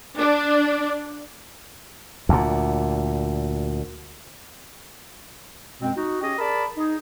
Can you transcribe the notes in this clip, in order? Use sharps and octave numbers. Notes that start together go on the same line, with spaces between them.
D4
D2 A#2
F#2 B2 G#3 C4
D#4 F#4
C#4 G4 G#4 D#5
G#4 A#4 D5 A5 B5
D#4 G#4